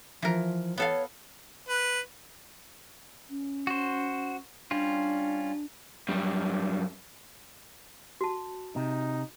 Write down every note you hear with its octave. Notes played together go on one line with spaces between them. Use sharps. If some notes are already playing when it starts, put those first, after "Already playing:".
E3 F3 A#4
B3 A4 C#5 F5
B4
C#4
F#4 C5
G3 C#4 D4 F4
F#2 G3
F#4 A5
C3 D#4